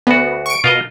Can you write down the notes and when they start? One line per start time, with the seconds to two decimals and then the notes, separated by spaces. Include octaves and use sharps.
0.07 D2 B3 F#4
0.46 C#6 D7
0.64 B2 F4 A#4 D#5